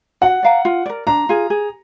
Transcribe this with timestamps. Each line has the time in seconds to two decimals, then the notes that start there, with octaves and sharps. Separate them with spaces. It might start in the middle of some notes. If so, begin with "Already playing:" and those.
0.21 F#4 F#5
0.43 D5 F5 A#5
0.65 F4
0.86 A#4 D5
1.07 D4 A#5
1.29 F4 G#4
1.50 G#4